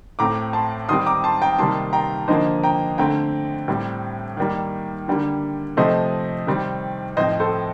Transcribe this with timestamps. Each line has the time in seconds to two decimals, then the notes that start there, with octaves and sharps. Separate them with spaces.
0.19 A2 A3 C4 A#5 D6
0.53 A5 C6
0.88 D#3 G3 C4 C6 D#6
1.06 A#5 D6
1.24 A5 C6
1.42 G5 A#5
1.58 C3 D#3 G3 A#3 A5 C6
1.93 G5 A#5
2.28 D3 F3 A#3 C5 D#5
2.63 G5 A#5
2.98 D3 A3 C4 G5 A#5
3.68 A2 G3 C4
4.37 D#3 G3 A#3
5.08 D3 G3 A#3
5.77 C3 F3 A3 C4 C5 D#5
6.47 C3 D#3 G3 C4
7.17 A2 F3 C4 C5 D#5
7.40 A4 C5